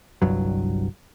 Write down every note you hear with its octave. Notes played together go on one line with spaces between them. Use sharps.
G1 C2 G2 F#3